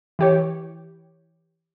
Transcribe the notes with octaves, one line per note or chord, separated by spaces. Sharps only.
E3 G4 C#5